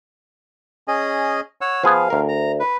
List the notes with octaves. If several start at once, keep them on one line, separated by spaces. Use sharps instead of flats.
C#4 G#4 D#5
C#5 F#5 E6
F3 B3 G#4 F5
D2 A#4
A#5
B4